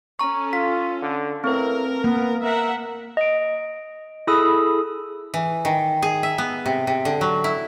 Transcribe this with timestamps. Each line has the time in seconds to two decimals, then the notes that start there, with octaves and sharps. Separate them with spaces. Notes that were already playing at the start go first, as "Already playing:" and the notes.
0.19 C#4 A4 A#5 C#6
0.53 F4 B6
1.02 D3
1.44 A2 C4 A#4 B4
2.04 A#3 B3
2.43 A#4 E5 F#5
3.17 D#5 D7
4.27 E4 G#4 A4 B5 D#6 E6
5.34 E3
5.65 D#3
6.02 G#4
6.23 E5
6.38 B3
6.66 C3
6.87 C3
7.05 D3
7.21 F#3
7.44 E4